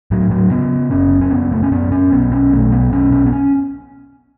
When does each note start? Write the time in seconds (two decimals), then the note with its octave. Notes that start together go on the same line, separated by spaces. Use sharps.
0.11 A2 F#3
0.31 F#3
0.51 C#3 B3
0.91 F#1 C#4
1.21 C#4
1.31 F#1 B3
1.52 A3
1.63 C#4
1.71 F#2 B3
1.92 C#4
2.12 B1 B3
2.32 C#4
2.52 B1 A3
2.72 B3
2.92 B1 C#4
3.12 C#4
3.26 B3
3.32 C#4